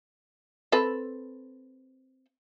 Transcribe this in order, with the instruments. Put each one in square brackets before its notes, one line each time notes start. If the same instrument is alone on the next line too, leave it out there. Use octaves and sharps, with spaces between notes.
[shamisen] C4 A4 B4